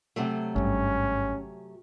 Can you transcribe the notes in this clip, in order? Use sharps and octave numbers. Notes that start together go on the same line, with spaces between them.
C3 F#3 A3
G#1 G2 C#4